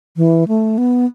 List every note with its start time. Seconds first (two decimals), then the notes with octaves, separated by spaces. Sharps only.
0.17 E3
0.48 A3
0.78 B3